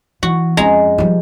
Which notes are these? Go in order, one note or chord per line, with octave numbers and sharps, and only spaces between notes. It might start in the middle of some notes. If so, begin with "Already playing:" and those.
E3 F#4
F2 G#3 C#4 A#5
F3 G3